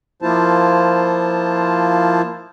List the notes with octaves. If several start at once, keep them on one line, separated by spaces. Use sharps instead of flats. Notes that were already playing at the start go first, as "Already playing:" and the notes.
F3 A#3 E4 F4 C5 A5